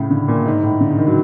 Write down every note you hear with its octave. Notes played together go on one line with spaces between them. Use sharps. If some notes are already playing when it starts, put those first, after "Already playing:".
Already playing: A2 C#3
D3
A#2
G#2
A2
D3
C#3
D#3
F#3